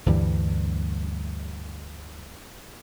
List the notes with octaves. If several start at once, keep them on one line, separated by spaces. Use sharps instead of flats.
D2 G2 E3 G3